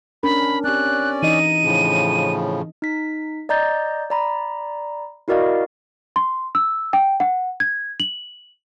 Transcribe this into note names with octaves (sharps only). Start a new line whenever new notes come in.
C#4 D4 A#4 B5
C4 C#4 G4 D5 F#6
E3 D#4 D#5 D#7
A2 C#3 F3 D#4
D#4 B6
D5 D#5 A#5 G6 A6
D5 A#5 B5
E4 F#4 A#4 D5 D#5 F5
C6
E6
G5
F#5
G#6
F#7